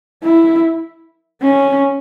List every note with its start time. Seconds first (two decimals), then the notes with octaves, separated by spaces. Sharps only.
0.23 E4
1.42 C#4